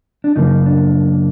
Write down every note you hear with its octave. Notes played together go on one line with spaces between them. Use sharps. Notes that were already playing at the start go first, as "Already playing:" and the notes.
D4
F#2 C#3 F3 A#3 D#4
D4